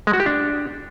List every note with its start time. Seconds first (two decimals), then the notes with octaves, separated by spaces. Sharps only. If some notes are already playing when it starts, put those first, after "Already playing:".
0.07 G#3
0.13 F#4
0.20 G4
0.26 D4